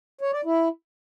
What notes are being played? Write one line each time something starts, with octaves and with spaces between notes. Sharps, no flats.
C#5
D5
E4